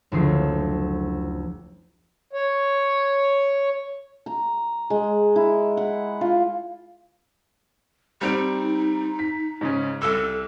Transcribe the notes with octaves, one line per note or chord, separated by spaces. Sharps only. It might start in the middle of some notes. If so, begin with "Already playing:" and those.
F#1 D2 F3 C7
C#5
A#5
G#3
E4
F#5
F4
G3 C4 D#4 D7
B6
G#2 C#3 C#4
C2 A4 E6